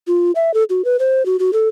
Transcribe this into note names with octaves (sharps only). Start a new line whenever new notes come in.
F4
E5
A4
F#4
B4
C5
F#4
F#4
A4